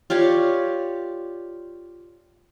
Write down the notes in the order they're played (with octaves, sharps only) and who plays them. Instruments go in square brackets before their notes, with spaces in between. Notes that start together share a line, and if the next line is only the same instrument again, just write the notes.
[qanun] F4 G4 C#5 D5